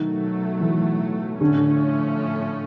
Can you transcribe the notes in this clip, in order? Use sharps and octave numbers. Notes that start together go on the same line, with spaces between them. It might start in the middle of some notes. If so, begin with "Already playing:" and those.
Already playing: B2 D#3 F#3 A3
E3
A2 D3 F3 A3 C#4